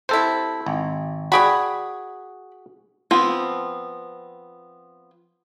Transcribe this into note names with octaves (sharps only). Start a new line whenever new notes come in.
C3 E4 A4 C5
G#1
F#4 G#4 D5 G5 B5
F3 B3 C4